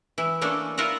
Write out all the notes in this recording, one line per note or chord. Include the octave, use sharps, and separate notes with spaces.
E3 E4
A3 A#3 C#4 D4 A4
E4 F4 A#4 E5 F#5